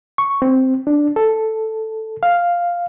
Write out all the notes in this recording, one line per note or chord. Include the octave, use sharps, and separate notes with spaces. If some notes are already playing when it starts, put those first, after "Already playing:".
C#6
C4
D4
A4
F5